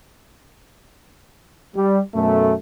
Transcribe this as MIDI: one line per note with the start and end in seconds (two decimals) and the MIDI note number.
1.76 1.99 55
2.15 2.54 42
2.15 2.54 47
2.15 2.54 57